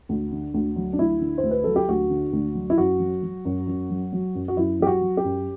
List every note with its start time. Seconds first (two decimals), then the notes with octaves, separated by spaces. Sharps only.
0.09 D2
0.31 D3
0.54 D2
0.76 F#3
0.93 D4
0.99 D2 E4
1.21 D3
1.38 C5
1.43 D2
1.51 B4
1.64 F#3 A4
1.76 G4
1.89 D2 F#4
2.10 D3
2.33 D2
2.55 F#3
2.70 E4
2.78 F#2 F#4
3.00 F#3
3.23 F#3
3.45 F#2
3.67 F#2
3.90 F#3
4.13 F#3
4.35 F#2
4.48 F#4
4.57 F#2 E4
4.80 F#3 G4
4.87 F#4
5.02 F#3
5.17 G4
5.24 F#2